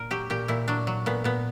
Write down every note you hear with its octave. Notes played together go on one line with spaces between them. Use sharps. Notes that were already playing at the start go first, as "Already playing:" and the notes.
Already playing: A#2 A#4
F#3 G4
A#2 G4
A#2 E4
F#3 D4
F#3
A#2 B3
A#2 B3